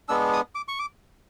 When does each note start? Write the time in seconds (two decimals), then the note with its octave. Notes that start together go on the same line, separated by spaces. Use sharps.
0.09 G#3 B3 D4 E6
0.33 D#6
0.55 D6
0.68 C#6
0.79 D6